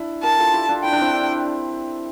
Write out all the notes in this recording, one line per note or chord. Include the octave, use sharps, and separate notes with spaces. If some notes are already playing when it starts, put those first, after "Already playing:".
Already playing: D4 E4
G4 A#4 A5
F4 A4
E4 G4
D4 F4
E4 G5
D4
C4 E4